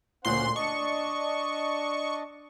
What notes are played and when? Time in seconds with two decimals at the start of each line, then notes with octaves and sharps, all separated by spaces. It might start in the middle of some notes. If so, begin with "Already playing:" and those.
0.25 D2 A#2 C#4 C5 F#5 C6
0.56 D4 D#5 A5 C#6